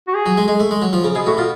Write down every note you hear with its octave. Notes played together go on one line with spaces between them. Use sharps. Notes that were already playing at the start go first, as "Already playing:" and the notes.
F#4
G#4
F#3
G#3
G#3
A3
G#3
F#3
F3
C#3
B2 G#4
A2 F#4
B2 F4